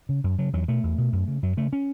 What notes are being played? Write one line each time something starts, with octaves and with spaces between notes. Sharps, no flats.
C#3
F#2
C#3 F#3
E2 F#3
B2 A3
E2
B2
F#2
C#3
F#2 F#3
C#3 A3
C#4